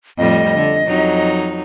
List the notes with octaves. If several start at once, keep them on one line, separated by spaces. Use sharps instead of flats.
F2 A2 G3 D#5
D3
F2 F#3 D#4